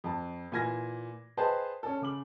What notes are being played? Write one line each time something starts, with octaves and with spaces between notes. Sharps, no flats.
F2 A5
A#2 E3 G#5 G#6 A#6
G#4 B4 C5 D#5 G5 A5
C#4 A4
C#3 D6 F#7